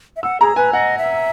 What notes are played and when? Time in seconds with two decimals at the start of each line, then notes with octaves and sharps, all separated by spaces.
0.16 E5
0.23 F#5 E6
0.41 G#4 A#5
0.56 B4 G#5
0.73 D#5 F#5
0.98 E5